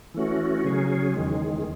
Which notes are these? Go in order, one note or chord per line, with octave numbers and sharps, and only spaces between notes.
E3 A3 C#4 F#4
C#3 F#3 C#4 G#4
E2 D#3 G#3